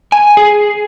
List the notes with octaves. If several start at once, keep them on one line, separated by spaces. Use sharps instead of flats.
G#5
G#4